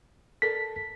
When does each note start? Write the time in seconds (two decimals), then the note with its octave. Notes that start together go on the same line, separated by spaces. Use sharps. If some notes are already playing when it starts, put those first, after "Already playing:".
0.42 A4 A#4 D5 B6